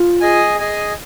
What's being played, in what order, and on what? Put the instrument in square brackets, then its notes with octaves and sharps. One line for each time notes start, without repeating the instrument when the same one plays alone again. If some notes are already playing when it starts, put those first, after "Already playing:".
Already playing: [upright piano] F4
[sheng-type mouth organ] G#4 D#5 G#5
G#4 D#5 G#5